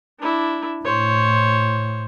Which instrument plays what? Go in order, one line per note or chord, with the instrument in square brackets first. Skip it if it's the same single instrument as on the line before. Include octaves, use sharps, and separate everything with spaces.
[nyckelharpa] D4 E4
[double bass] A2 [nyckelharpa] C5 C#5